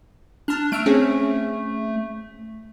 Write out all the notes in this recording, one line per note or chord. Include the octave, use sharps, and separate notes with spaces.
D4 A5 F6
A3 E6 F6 D7
C4 C#4 G#4